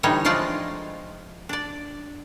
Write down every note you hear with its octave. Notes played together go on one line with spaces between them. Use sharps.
A2 D3 E3 G3 D#4 C#5
F3 G#3 A3 F4 D5 D#5
D4 D5